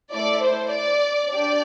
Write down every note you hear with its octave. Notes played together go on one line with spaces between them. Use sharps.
A3 E4 A4 D5
C5
D5
D4 G4 D5